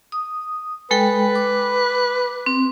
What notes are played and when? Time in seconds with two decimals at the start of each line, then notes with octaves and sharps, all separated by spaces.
0.12 D#6
0.91 G#3 A4 B4 G5
1.35 D6
2.46 C4